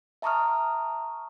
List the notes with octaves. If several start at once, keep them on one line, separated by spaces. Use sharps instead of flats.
E5 A5 A#5 C#6 D#6 F6